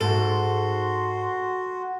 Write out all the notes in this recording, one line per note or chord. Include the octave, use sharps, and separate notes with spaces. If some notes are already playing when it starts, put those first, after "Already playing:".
G#2 F#4 A4 C6